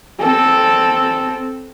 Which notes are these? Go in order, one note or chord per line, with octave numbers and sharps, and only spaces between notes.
C4 A4